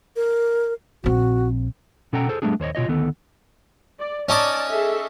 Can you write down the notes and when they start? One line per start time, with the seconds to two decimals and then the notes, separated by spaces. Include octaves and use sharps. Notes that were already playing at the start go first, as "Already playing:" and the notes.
0.16 A#4
1.04 A#1 C4 F#4
2.13 B2 C#4 A4 F#5 G5 A#5
2.29 G#4 A4 C5
2.42 G3 A3 B3 D4 G#4
2.60 D#2 C5 C#5 D#5
2.75 B2 F4 C#5 D#5
2.88 D2 D#3 B3 A4
3.99 D5
4.29 C#4 D#4 D5 A5 D6
4.71 G#4 A4 E5